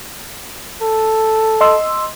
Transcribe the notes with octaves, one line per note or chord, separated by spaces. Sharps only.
A4
D#5 C6 E6